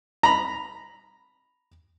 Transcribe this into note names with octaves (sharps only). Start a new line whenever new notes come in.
A#5 B5